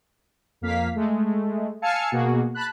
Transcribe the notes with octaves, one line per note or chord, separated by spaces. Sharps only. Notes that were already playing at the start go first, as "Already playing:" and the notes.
F2 A#3 F5 B6
G#3 A3
F5 G#5 A5 E6 F6 C#7
B2 A#3 F#4 G#4
A5 B5 F#6